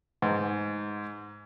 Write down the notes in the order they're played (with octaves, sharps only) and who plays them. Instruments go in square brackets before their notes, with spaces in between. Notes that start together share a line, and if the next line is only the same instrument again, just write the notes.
[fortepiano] G#2